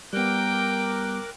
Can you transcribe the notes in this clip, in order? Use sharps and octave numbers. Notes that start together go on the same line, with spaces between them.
G3 B3 A#4 G5 D6 F#6